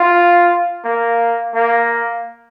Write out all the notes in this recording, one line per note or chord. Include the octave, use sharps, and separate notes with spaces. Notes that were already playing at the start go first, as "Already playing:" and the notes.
Already playing: F4
A#3
A#3